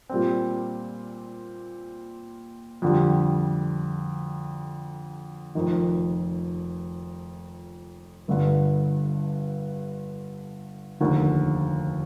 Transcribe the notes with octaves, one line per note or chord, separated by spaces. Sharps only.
A#2 G3 C4
F2 D3 G3
F1 F2 D#3
G1 G2 D3
F1 D#2 D3